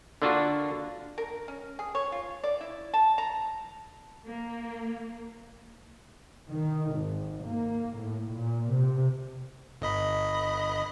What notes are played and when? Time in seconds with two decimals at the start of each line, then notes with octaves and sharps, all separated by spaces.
0.22 D3 A#3 D4 F4 F#4
1.18 A#4
1.48 C#4
1.79 G#4
1.95 C#5
2.12 F4
2.44 D5
2.61 E4
2.94 A5
3.18 A#5
4.26 A#3
6.50 D#3
6.94 G#1
7.47 A#3
8.00 A2
8.34 A#2
8.72 C3
9.82 G1 D#5 B5